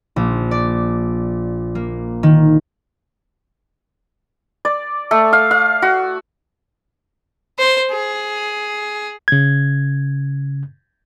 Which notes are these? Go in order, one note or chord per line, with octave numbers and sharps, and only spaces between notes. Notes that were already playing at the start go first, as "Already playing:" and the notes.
A#1
D5
A#3
D#3
D5
A3
F5
F5
F#4
C5
G#4
C#3 G#6